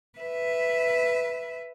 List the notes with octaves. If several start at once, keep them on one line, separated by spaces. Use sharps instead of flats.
B4 E5